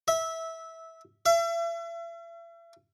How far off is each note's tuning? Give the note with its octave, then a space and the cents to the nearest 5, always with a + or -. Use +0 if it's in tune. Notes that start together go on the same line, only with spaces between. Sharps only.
E5 -15
E5 +40